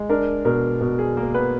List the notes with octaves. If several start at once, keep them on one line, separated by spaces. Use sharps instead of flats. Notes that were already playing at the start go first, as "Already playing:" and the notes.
Already playing: G#3
D4 A#4
B2 A#4
B2
G#4
A#3 A#4
B3 B4